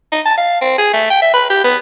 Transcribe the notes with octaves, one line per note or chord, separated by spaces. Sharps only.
D#4
A5
F5
C4
G#4
A3
G5
E5
B4
G4
B3